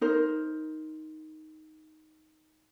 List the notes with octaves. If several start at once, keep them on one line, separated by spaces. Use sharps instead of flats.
D#4 A#4 C5